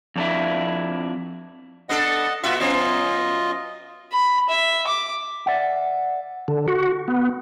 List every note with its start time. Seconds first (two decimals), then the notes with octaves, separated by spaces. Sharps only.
0.16 F2 D4 E4
1.89 B3 D4 A4 D#5 F#5
2.43 A#2 F4 F#4 E5 F#5
2.61 F#2 B3 F4 D#5
4.12 B5
4.49 E5
4.87 D6
5.46 D5 E5 F#5
6.48 D3
6.68 F#4
7.08 B3